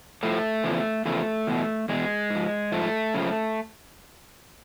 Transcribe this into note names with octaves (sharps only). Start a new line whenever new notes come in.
A2 F3 A3
E2 C#3 F3
E2 C#3 F3 A3
E2 B2
E2 B2 G#3
G#2 F3
G#2 F3 A3
F#2 C#3 F3